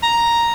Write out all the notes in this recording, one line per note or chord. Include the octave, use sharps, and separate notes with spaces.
A#5